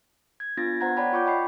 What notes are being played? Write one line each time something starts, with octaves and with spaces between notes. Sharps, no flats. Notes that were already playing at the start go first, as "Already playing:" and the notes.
G#6
B3 D4 F4 A6 A#6
B3 C5 F#5 A#5 G#6
C#5 D5 F#5 G5 A5 B5
F4 C#6 D6 G6
D#5 G5 B5 C7